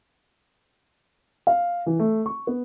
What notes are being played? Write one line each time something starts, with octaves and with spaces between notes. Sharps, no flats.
F5
E3
A3
C#6
B3